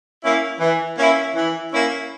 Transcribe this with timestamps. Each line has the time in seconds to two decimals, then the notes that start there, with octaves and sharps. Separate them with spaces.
0.25 A#3 C#4 E4
0.61 E3
0.98 A#3 C#4 E4
1.36 E3
1.73 A#3 C#4 E4